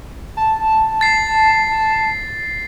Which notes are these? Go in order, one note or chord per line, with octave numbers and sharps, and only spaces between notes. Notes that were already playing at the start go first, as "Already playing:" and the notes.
A5
A6 C7